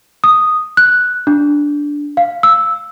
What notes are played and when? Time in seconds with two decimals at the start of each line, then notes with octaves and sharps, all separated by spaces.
0.24 D#6
0.77 F#6
1.27 D4
2.17 F5
2.43 E6